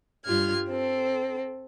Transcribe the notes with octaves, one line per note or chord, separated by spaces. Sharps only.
G2 F4 G4 F6 G#6
C4 A4